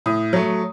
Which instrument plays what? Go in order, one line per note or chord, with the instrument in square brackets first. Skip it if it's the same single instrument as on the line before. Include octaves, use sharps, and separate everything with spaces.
[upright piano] A2 D#6
F#3 A3